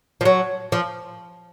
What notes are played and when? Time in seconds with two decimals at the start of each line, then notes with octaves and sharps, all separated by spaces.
0.21 F3
0.25 F#3
0.72 F3